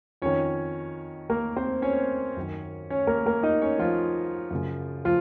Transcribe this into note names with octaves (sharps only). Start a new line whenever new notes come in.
F2 D#3 C#4 C#5
A#3 A#4
C4 C5
C#4 C#5
F#2 D#3
C#4 C#5
A#3 A#4
A#3 A#4
D#4 D#5
C#4 C#5
F3 F4
F#2 C#3
F3 F4